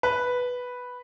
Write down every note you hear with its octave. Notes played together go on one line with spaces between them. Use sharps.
B4